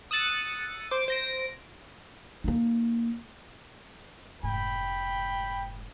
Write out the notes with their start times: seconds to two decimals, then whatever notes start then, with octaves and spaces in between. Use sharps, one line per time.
0.11 D#6 E6 F#6 A6 C#7
0.91 C5 D6
1.08 C5 A#6 D7
2.44 A#3 D#4
4.43 F1 G#2 G5 B5